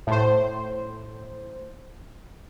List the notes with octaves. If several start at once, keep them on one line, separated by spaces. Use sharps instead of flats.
A2 C5